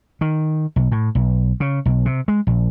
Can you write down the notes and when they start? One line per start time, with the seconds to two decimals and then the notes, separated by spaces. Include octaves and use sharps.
0.21 D#3
0.76 B1
0.92 A2
1.15 B1
1.60 C#3
1.86 B1
2.05 C3
2.28 G#3
2.47 A#1